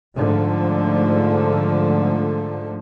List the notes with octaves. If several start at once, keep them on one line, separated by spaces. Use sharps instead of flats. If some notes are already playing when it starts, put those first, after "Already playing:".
G#2 D3 F3 A3